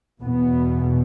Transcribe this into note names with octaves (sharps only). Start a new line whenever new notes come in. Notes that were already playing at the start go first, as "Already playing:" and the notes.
E2 B2 B3